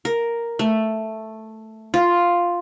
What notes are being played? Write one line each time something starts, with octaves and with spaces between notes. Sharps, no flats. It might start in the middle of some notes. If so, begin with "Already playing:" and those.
A#4
A3
F4